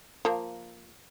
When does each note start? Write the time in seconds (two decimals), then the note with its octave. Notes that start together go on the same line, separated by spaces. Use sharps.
0.25 F3 A#3